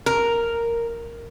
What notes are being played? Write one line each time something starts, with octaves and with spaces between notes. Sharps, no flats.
A#4